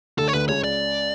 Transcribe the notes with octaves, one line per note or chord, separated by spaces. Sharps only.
D2 D3 A4
C#5
D2 D3 B4
C#2 C#3 C#5
D5